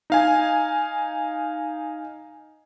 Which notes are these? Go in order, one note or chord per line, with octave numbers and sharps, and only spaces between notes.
D#4 F5 G#5